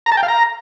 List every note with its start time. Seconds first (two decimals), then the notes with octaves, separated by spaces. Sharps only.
0.06 A#5
0.12 A5
0.17 G5
0.23 F5
0.28 A#5